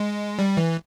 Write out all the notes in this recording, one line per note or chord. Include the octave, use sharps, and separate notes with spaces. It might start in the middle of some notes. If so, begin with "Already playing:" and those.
Already playing: G#3
G3
E3